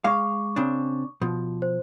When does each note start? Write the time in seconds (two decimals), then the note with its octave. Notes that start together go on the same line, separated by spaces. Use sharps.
0.04 G#3 F5 C#6 D6
0.56 C#3 C4 D4
1.21 B2 F3
1.62 C5